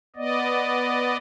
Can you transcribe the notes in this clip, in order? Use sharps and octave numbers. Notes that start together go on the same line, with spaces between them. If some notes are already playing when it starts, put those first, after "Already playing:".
B3 D5 D#5